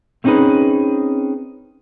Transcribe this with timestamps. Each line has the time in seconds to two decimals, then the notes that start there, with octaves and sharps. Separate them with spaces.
0.24 A3 C4 C#4 D#4 G#4 B4